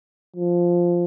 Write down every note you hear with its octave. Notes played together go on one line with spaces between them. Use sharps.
F3